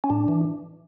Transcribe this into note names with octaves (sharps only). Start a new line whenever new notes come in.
C#4
A2 D4
E3